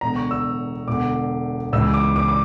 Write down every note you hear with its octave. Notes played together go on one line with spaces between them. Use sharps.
E1 E2 D3 A#5
C#6
E6
E1 E2 D3 D6
C#2 C#3 E3 E6
D6
D6
D6